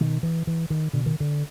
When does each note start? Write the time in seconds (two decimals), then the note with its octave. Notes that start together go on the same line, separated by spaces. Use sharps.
0.01 B2 D#3
0.23 E3
0.47 E3
0.70 D#3
0.93 B2 D3
1.06 D#3
1.20 D3